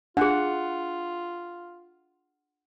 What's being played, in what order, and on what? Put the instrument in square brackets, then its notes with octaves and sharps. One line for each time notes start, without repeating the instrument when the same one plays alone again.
[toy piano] D4 G#4 [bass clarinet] F4 [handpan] F#5